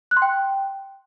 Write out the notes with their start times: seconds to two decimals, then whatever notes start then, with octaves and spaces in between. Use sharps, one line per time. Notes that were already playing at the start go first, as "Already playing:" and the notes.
0.11 F#6
0.17 C6
0.22 G5